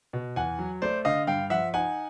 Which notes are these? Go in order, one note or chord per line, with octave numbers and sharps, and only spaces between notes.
B2
E2 F#5 G#5
F#3
A3 C5 D5
D3 D#5 F5
G2 F5 G5
F3 E5 F#5
D#4 F#5 G#5